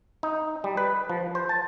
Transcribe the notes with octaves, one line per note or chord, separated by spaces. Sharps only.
D#4
G3
B4
F3
C5
A5